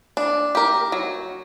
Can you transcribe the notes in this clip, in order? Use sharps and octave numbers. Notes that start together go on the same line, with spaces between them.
D4
G4 A#4
F#3